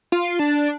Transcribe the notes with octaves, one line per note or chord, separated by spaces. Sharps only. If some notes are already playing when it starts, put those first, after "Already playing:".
F4
D4